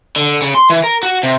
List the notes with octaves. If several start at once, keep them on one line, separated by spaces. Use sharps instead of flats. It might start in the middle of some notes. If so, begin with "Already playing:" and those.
D3
C#3
C6
E3
A#4
F#4
C3